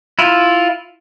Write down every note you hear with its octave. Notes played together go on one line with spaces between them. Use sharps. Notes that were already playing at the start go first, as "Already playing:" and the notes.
E4 F4